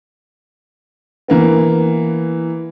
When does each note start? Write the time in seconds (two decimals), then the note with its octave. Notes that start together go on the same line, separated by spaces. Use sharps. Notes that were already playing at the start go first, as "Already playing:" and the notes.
1.28 E3 A#3 B3